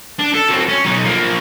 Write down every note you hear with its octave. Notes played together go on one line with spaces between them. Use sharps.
D4
A4
F#3 C4
C#4
B1 D#4
F3 A#3